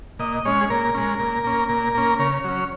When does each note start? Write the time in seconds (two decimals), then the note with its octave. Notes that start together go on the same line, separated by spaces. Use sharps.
0.19 A#2 D#5
0.45 G#3 C#4 C#5
0.61 G#4
0.70 A#2 A#4
0.94 G#3 C#4
1.19 A#2
1.44 A#3 C#4
1.69 A#2
1.94 A#3 C#4
2.19 C#3 C#5
2.44 F#3 C#4